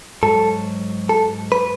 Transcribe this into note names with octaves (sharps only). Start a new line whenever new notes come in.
G#2 F#3 A4
A4
B4